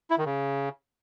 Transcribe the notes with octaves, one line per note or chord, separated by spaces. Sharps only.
E4
D#3
C#3